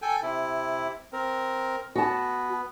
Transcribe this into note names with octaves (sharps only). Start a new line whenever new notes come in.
A4 G5 G#5
C3 E4
C4 A#4
B3 F#4 A5